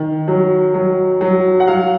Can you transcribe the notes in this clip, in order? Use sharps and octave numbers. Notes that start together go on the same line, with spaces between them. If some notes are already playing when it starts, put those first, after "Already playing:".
Already playing: D#3
F#3
F#3
F#3
F#5
F#3 F5